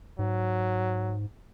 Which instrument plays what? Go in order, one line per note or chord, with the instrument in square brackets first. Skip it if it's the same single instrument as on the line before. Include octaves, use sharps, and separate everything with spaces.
[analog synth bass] G#2 [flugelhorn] F#3